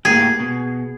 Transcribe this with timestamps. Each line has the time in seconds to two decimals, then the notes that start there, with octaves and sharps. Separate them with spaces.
0.05 A2 A#3 G4 G#4
0.40 B2